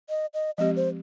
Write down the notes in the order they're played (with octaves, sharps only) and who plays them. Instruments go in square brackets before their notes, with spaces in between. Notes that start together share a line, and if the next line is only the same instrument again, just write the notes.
[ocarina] D#5
D#5
[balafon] F3 G#3 C4 G4 [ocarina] D#5
[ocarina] C5